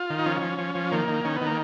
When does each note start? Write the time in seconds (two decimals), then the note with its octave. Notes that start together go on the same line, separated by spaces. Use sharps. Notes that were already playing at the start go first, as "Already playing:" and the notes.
Already playing: F4
0.10 D#3
0.19 D#4
0.26 F3 C#4
0.42 F3
0.58 F3
0.75 F3
0.92 D#3 A#3
1.08 D#3
1.24 D#3 C#4
1.36 B3
1.41 D#3
1.47 A#3